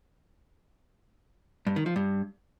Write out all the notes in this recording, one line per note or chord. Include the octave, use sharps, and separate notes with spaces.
G2
D#3
F3
G2